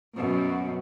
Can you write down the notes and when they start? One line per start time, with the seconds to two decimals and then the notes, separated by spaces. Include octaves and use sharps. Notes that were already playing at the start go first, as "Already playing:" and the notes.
0.17 F#2 B2